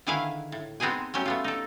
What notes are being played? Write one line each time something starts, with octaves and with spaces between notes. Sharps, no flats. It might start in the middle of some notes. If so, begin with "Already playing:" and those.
D3 D#3 E4 G#4 B4 F5
A2
G#3 B3 C4 D#4 G#4 G#5
F#3 G3 A3 C#4 G4
A3 B3 F4
D#4 A4